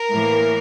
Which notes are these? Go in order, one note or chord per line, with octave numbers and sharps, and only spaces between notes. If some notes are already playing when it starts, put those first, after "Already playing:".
Already playing: A#4
A2 E3 A#3